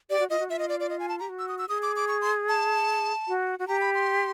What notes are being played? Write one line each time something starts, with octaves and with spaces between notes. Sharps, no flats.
G4 D5
F#4
F4 D#5
F#4
F4 E5
D#5
D5
D5
D#5
G#5
A5
G4 A#5
F#4
E6
D#6
E6
G#4 D#6
D6
D6
C#6
C6
A5
F#4
F#4
G4 A#5
B5
C6